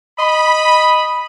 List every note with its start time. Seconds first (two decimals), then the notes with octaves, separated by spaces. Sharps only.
0.19 D#5 B5